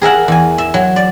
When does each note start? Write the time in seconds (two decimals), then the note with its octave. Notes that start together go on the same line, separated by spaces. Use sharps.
0.02 G#4 A#4 E5 F#5
0.28 E2 G#5
0.58 E5
0.74 F#3
0.96 D5